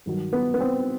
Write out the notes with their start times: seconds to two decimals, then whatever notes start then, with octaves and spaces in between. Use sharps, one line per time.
0.06 G2 D#3 F#3
0.33 B3
0.54 B3
0.60 C4